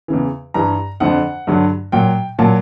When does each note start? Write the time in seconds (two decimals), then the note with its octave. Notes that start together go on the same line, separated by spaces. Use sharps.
0.08 E2 C#3 E3
0.54 G2 E3 A#5
1.00 F2 D3 F3 F#5
1.47 G2 D3 F#3
1.92 A#2 F#3 G5
2.39 A#2 F#3 A5